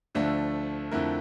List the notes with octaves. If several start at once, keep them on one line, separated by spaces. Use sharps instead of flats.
D2 D3 F3 A3 D4
F2 D3 A3 E4 A#4